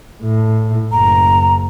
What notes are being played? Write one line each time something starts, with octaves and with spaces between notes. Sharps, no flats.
A2
F#1 A#5